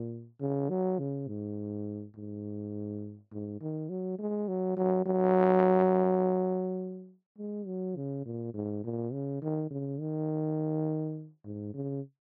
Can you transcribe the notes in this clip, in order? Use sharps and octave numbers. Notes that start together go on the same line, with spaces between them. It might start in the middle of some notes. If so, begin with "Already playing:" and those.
Already playing: A#2
C#3
F#3
C#3
G#2
G#2
G#2
D#3
F#3
G#3
F#3
F#3
F#3
G#3
F#3
C#3
A#2
G#2
A#2
C#3
D#3
C#3
D#3
G#2
C#3